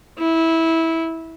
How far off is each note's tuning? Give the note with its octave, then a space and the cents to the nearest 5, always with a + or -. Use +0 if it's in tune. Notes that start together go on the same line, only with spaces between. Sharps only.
E4 -15